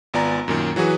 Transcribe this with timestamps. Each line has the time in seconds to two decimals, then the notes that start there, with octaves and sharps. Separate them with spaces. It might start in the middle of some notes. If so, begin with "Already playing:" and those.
0.14 G#1 B3 F4 D5 G#5 A#5
0.48 F#2 A#2 D#3
0.76 E3 F#3 F#4 G#4 B4